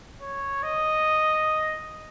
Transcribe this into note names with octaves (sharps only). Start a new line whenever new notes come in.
C#5
D#5